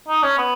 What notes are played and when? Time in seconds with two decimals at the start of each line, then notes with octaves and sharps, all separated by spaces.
0.09 D#4
0.23 C#4
0.38 B3